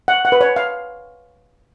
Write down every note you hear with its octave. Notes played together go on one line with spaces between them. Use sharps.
F#5
F#5
B4
C#5
F5